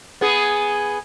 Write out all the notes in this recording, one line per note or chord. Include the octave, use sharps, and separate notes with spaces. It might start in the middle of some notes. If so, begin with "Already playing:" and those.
B3 G#4